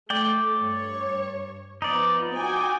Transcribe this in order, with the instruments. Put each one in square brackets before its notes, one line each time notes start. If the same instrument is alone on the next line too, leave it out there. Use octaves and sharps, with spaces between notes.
[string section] A3 [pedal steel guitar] D5 G5
[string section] G2 C#5
[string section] F3 B3 [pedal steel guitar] D#4 D5
[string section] F#4 G5 G#5